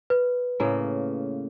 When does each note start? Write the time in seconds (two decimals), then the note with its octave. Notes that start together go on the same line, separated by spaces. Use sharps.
0.10 B4
0.60 A2 C#3 A#3